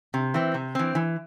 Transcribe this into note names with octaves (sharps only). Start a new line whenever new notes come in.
C3
E3 C4
C3
E3 C4
E3